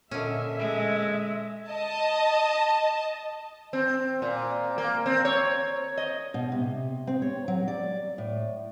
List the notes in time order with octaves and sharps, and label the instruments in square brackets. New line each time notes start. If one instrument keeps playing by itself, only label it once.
[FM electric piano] A#2 A#3 D#5 [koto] D3 C#4 [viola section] E5
[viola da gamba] G#3
[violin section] D#5 A5
[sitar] C4
A#2
A#3
C4
C#5
D#5
[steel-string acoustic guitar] B2
C3
C4
C#5
F#3
D5
A2